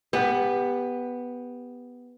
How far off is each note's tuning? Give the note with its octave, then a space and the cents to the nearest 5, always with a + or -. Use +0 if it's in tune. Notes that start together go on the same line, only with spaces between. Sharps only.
B3 +0 G4 +25